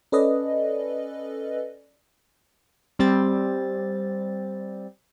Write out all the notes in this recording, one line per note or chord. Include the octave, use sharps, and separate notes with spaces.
C#4 A4 B4 D5 D#5
G3 C4 A6